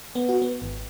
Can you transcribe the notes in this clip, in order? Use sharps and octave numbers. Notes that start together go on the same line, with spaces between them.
B3
F#4
B3
G#1